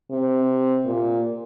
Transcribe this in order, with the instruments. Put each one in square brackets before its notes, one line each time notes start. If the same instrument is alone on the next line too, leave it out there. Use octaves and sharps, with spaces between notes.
[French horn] C3
A#2